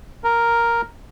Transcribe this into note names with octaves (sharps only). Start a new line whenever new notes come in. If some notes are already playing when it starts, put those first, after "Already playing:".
A#4